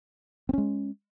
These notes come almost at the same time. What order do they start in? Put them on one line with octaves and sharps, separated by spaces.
C4 C#4 G#3